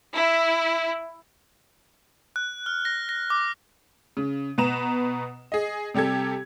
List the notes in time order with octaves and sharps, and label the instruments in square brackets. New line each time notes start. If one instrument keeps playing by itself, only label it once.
[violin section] E4
[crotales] F#6
F6
A#6
A#6
D6
[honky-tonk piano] C#3
B2 B4 A#5 E7
G#4 D#5
C3 G3 G4 A4 G#6